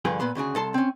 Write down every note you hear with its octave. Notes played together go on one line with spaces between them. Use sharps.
G2 D3 F3 G#4 B4 G5
A#2 B3 B4 C6
D2 C#3 F#4 G#4
C2 A4 A5 C6
C4 C#4